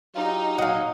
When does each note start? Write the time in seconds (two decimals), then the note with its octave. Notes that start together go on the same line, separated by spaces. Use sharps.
0.16 F#3 D#4 F4 G4
0.58 A#2 F#3 D#5 F5 F#5